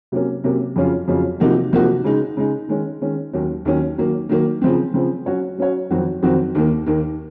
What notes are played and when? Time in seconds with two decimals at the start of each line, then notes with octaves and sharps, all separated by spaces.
0.12 C3 F#3 A#3 C#4
0.44 C3 F#3 A#3 C#4
0.76 F2 C#3 F#3 C#4 F4
1.08 F2 C#3 F#3 C#4 F4
1.40 C3 F3 A#3 D#4 F#4
1.73 C3 F3 A#3 D#4 F#4
2.04 C#3 G#3 D#4
2.37 C#3 G#3 D#4
2.69 D#3 G#3 C#4
3.01 D#3 G#3 C#4
3.33 D#2 D#3 F#3 C#4
3.65 D#2 D#3 F#3 C#4
3.98 D#3 F#3 A#3
4.29 D#3 F#3 A#3
4.62 C#3 F3 C4
4.94 C#3 F3 C4
5.26 F#3 C#4 F#4 C#5
5.58 F#3 C#4 F#4 C#5
5.90 F2 D#3 F#3 C4 F#4
6.23 F2 D#3 F#3 C4 F#4
6.55 D#2 D#3 A#3
6.86 D#2 D#3 A#3